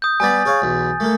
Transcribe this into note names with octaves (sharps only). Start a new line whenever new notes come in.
D#6 G6
G3 B3 D5 G#5 A6
G#4 C#5 F5
B1 E2
A3 A#3 A4